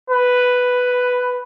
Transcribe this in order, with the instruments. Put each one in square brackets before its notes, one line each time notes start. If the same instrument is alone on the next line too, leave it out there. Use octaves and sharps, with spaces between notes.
[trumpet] B4